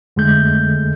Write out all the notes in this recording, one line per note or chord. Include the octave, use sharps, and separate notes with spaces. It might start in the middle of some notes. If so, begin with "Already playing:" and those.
F2 D3 G#3 A3 G6